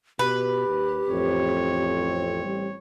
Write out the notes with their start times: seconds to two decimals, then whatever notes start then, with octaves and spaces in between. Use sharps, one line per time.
0.19 B2 G4 B4
0.68 D#2
1.08 A1 F2 C4 C#5
2.44 G3